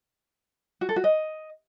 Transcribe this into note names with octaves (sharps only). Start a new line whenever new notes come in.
F#4
A4
F#4
D#5